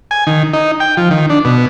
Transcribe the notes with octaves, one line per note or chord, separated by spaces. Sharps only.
G#5
D#3
D#4
G5
F3
D#3
D4
B2